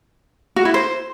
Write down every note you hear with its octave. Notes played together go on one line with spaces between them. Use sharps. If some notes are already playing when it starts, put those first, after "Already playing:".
F#4
E4
C5